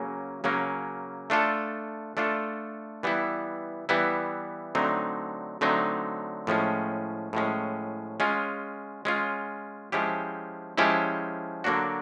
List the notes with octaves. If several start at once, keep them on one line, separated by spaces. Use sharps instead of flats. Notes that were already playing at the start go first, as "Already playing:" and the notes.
Already playing: C#3 F#3 A#3 C#4
C#3 F#3 A#3 C#4
A3 D4 F4 A4
A3 D4 F4 A4
E3 G3 B3 E4
E3 G3 B3 E4
D3 F#3 A3 C4 D#4
D3 F#3 A3 C4 D#4
A2 F3 G#3 C#4
A2 F3 G#3 C#4
G#3 C#4 F4
G#3 C#4 F4
F3 G#3 C#4 E4 G4
F3 G#3 C#4 E4 G4
D3 F#3 A#3 D4 F#4